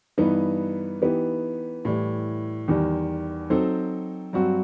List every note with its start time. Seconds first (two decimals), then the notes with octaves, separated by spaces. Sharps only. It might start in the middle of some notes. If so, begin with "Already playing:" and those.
0.18 G2 E3 B3 D#4
1.02 E3 B3 D#4 G4
1.85 A2 E3 G3
2.68 E2 D#3 G3
3.50 F#3 C4 D#4 A4 C5
4.33 G2 F#3 C4 F#4